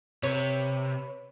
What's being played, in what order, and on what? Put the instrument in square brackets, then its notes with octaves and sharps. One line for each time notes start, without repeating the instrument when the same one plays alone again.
[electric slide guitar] C3 [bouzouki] B4 C#5